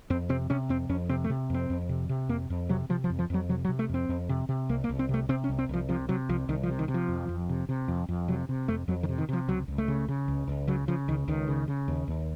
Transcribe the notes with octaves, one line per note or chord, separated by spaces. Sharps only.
F2 C4
C3 C4
C3 C#4
F2 C4
F2 C#4
C3 C4
A3
C3
F2 C4
F2
C3
C3
F2 A#3
F2
C3 F#3
C3 F3
F3
F2
F3
F2 F#3
C3 F#3
F#3
C3
A3
F2 C4
F2
C3
C3
C2 A#3
A#3
C2
C4
C3 A3
C3 C4
C#4
C2
C4
C2 F3
C3 F3
C3 F#3
C2 F3
C2 D#3
F3
C3
D#3
C3
F3
F2
F2
C3
C3
F2
F2
C3 F#3
C3
F2 A3
F2 F#3
D#3
C3
D#3
C3 F3
C#2 F#3
C#2
A3
C#3
C#3
C#2
C#2
C#3 F#3
C#3 F3
C#2 D#3
C#2 D#3
C#3
C#3
D#2
D#2